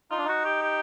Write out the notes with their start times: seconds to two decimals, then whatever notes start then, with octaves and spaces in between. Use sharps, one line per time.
0.10 D#4 F4
0.18 D4
0.25 D#4 F#4
0.45 G4
0.62 G4